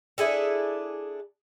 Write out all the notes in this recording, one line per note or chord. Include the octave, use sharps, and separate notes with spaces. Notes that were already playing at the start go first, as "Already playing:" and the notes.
D4 E4 G#4 A4